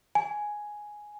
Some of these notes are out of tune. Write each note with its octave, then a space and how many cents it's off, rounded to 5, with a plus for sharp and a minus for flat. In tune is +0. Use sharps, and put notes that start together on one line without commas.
G#5 +5